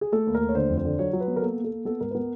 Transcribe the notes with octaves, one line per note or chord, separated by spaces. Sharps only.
G#4
A3 A4
D#2
A#4
A3
C#5
D3 C5
F2
C5
D3
F#3 C#5
F#3
B4
B3
A#4
A#3 A4
A#3
A4
A#3
B3 A4
G#2 A#4
B4
B3 A#4